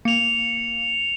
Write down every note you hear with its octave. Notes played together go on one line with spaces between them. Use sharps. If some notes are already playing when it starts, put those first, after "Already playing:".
A#3 C#7 F7